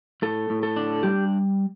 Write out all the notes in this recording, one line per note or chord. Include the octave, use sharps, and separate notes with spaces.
A2 A4
A2
A4
D4
G3 G4